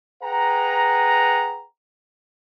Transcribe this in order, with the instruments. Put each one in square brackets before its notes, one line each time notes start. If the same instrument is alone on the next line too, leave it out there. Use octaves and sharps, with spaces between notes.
[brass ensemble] G#4 B4 F#5 G5 A#5